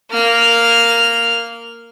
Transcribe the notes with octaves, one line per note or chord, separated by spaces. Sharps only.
A#3 F6